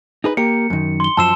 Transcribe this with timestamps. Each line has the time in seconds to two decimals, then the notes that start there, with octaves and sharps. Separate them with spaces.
0.24 D#4 G#4 B4
0.37 A#3 G4 A#4 C#7
0.70 F#2 D#3
1.00 C6 G7
1.17 F#2 F3 A5 C6 E6 E7